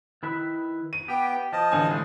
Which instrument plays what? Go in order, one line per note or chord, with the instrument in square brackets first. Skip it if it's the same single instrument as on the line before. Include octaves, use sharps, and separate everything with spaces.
[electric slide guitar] D#3 E4 B4
[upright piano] D#7
[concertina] B3 G5 [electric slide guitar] G4
[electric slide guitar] F3 [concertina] D#5 A5
[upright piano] A1 D3 G#5
[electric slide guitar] C3 G#3 A3